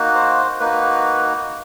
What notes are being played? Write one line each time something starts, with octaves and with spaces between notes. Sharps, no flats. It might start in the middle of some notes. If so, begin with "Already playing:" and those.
Already playing: A#3 D#4 F#4
C5
A#3 D#4 F#4 B4